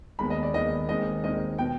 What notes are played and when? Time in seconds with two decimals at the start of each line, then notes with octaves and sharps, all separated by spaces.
0.19 D#2 D#3 G#3 B3 B5
0.30 D#5
0.43 D5
0.54 D#2 D#3 G#3 B3 D#5
0.89 D#2 D#3 G#3 C4 D#5
1.24 D#2 D#3 G#3 C4 D#5
1.58 B2 B3 G5